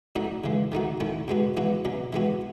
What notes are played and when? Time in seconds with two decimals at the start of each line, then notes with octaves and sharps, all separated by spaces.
0.16 A2 F#3 A3 D#4 F#4
0.44 C#3 E3 G#3
0.72 D#3 A3 D#4 F#4
1.00 D#3 A3 C#4 E4
1.28 B2 G#3 B3 F#4
1.57 G#2 E3 B3 F#4
1.85 B2 F#3 C#4
2.13 E3 G#3 B3 F#4